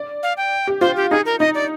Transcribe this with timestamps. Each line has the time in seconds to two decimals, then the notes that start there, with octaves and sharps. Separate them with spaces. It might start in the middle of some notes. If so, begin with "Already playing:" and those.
Already playing: D5
0.23 F5
0.37 G5
0.67 G4
0.81 F4 C5
0.96 G4
1.11 D#4 G#4
1.26 A#4
1.40 D#4 D#5
1.55 D5